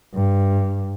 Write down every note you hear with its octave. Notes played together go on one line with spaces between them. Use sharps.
G2